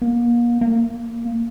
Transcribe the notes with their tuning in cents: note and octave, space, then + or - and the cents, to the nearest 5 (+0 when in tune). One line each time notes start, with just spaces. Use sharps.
A#3 +35
A#3 -10